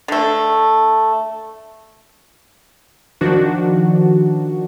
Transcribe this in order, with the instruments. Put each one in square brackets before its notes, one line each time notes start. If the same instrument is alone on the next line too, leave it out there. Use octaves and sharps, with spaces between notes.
[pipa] D3 A3
[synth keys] D#3 F3 D4 F#4